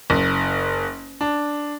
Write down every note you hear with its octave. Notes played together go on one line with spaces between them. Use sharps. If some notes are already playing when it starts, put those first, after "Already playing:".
F#1
D4